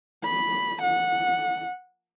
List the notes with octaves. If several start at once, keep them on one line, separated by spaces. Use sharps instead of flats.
B5
F#5